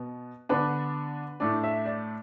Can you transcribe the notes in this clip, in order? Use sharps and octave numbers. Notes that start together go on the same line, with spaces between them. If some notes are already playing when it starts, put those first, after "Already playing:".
Already playing: B2 B3
D3 B3 D4 B4
A2 A3 D4 D5
E5
D5